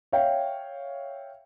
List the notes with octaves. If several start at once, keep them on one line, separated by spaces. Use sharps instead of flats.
C#5 E5 F5 G5